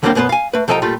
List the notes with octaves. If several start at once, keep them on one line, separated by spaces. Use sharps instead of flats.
D#2 D3 G3 A#3 C4 G4
F#2 B2 B3 B4 C5
F5 G#5
A3 B4
C2 F3 A4 D#5 G5 A#5
A#2 G3 A3 F4